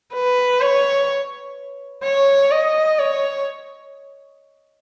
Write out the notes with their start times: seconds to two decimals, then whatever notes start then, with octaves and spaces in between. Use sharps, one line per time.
0.14 B4
0.61 C#5
2.03 C#5
2.51 D#5
2.99 C#5